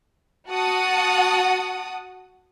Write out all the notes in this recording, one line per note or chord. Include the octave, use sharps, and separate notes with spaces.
F#4 F#5 A5 D#6